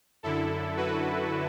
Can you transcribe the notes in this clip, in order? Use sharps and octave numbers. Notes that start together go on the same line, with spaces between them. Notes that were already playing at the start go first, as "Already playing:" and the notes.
F#2 D3 E4 A4
F#4 B4